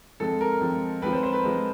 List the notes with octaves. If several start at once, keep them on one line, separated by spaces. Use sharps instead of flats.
F3 G#3 C4 A4
A#4
F3 G#3 C4
F3 G#3 C4 B4
C5
C5
B4
F3 G#3 C4